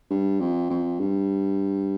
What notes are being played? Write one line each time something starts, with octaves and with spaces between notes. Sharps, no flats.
G2
F2
F2
G2